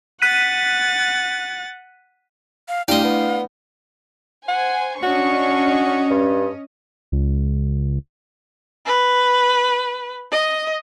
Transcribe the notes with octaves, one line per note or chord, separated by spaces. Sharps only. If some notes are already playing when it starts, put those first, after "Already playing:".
F#5 F#6 A6 B6 D#7
F5
A3 D4 E4 G4 D5 D#5 F5
B3
C5 F#5 G#5
C#4 D4 F#4 D#5 C#6
G2
C#2
B4
D#5